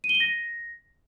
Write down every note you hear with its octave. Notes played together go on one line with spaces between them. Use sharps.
D#7
G7
D#7
A#6